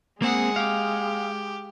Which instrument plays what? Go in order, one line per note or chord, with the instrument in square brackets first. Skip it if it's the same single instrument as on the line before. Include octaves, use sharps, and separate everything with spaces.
[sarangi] G#3 [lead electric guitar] A#3 C4 [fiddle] G#4 F#5
[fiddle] G4 [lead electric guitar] F5